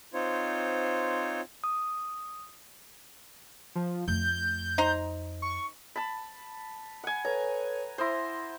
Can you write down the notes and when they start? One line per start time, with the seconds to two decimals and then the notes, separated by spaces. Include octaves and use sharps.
0.14 C4 D#4 F4 C5 C#5
1.64 D#6
3.75 F3
4.08 F2 A3 G6
4.78 D#4 C5 A#5
5.42 C#6
5.96 A5 B5
7.04 F#5 G#5
7.25 A4 B4 C#5 A#5
7.98 E4 C5 C6 D#6 A#6